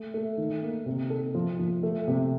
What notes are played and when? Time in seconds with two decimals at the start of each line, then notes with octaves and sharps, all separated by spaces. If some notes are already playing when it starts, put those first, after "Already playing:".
Already playing: A3
0.14 A3
0.38 D#3
0.62 A#3
0.86 C3
1.10 A4
1.35 F3
1.59 F3
1.83 A3
2.08 C3